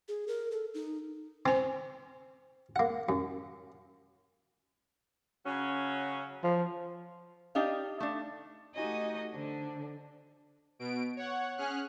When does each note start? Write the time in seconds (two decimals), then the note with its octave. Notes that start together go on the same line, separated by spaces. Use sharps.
0.08 G#4
0.28 A#4
0.52 A4
0.74 D#4
1.46 C4 C5 G#5
2.76 A#3 F#5
3.09 F#2
5.45 C#3 F#3 C#4
6.43 F3
7.55 D4 D#4 G4 F5
8.00 A3 D4
8.74 A3 D#4 F#4 G4 D#5 G#5
9.31 D3 D4 C5
10.79 B2 D7
11.16 C#5 F#5
11.57 C#4 G#4 F6 F#6